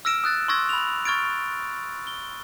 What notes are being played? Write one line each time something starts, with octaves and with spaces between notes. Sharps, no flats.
E6 F6 A#6 D7 E7
D#6 F#6 A6
C6 C#6 D#6 E6 G#6 A#6
B5 F7
C#6 F6 G#6 A6 D7
G7